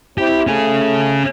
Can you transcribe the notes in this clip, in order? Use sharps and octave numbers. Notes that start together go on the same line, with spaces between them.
C4 E4 G4
A3 C#4 G#4